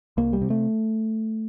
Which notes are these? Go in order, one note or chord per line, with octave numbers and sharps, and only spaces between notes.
C2 A#3
G3
C3
A3